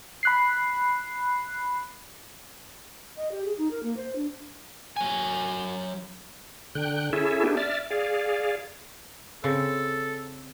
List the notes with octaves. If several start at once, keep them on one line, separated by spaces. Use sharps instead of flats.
B5 F#6 C7
D#5
G4
G#4
D#4
A#4
A#3
C5
D4
F#3 G#5
D3 G5 F#6
C#4 E4 G#4 A4 E5
B3 D4 G4 G#4
D5 E5 F6 A6
G#4 D5 F5
C#3 C4 A4